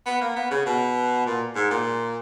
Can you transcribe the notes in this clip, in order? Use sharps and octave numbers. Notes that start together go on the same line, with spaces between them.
B3
A#3
B3
C#3
B2
A#2
G#2
A#2